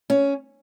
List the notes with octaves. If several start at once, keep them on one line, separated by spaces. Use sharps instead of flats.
C#4